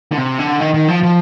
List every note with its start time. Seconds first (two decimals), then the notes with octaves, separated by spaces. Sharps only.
0.12 D3
0.17 C3
0.39 D3
0.61 D#3
0.74 D#3
0.88 F3
1.03 F3